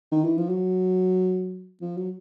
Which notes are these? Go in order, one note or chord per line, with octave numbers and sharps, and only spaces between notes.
D#3
E3
F3
F#3
F3
F#3